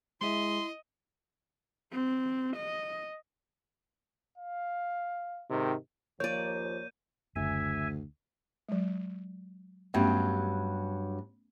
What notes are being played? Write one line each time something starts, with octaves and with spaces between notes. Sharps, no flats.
G#3 E4 G#4 D#5 E5 C6
C4
D#5
F5
G#2 C3 D#3
D#2 F3 A#3 C#5 D5 G6 D#7
F#1 D2 E5 G#5
F#3 G#3
G2 F#3 A3 B3 C#4